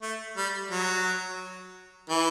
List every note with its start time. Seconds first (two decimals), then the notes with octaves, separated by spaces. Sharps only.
0.02 A3
0.37 G3
0.71 F#3
2.09 E3